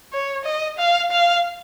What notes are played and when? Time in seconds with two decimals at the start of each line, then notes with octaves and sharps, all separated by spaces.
0.13 C#5
0.45 D#5
0.78 F5
1.11 F5